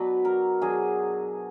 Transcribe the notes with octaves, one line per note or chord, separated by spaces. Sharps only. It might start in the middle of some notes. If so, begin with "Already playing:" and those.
Already playing: B2 F#3 D4 B4
A#4
B2 F#3 D4 G#4